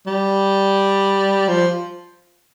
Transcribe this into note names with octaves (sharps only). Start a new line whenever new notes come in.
G3
F3